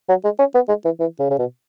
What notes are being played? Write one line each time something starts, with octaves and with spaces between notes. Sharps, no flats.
F#3
G#3
C#4
B3
G#3
E3
E3
C#3
C#3
B2